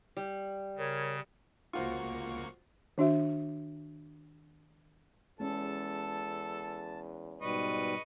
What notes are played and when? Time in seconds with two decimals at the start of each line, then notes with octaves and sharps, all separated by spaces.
0.17 G3
0.76 C#3 A#4 C#5
1.73 C#2 A#3 F4 F#4 C5 C#6
2.98 D#3 D4 F#4 E5
5.40 E2 G#3 C#4 A4 A5
7.42 G#2 B2 G3 B4 D#5 C#6